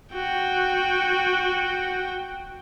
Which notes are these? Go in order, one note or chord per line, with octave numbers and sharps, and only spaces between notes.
F#4 G5